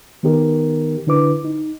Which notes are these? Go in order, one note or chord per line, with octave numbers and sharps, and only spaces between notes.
D#3 B3 D#4 G4 A#4
D3 D4 E4 B4 D6
D#4